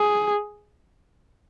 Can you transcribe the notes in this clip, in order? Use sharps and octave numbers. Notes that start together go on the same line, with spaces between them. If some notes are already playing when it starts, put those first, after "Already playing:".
Already playing: G#4